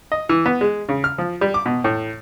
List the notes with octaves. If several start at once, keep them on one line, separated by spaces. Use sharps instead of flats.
D#5
E3
B3
G#3
C#3
F6
F3
G3
D6
B2
A2